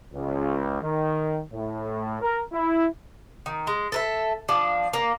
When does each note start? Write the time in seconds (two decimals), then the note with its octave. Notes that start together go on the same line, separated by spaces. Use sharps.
0.13 C#2
0.82 D#3
1.53 A2
2.22 A#4
2.53 E4
3.46 D#3
3.67 G#3
3.92 A4 A#4 E5
4.49 F3 D4
4.93 A#3